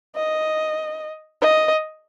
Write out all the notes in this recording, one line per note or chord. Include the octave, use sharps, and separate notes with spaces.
D#5
D#5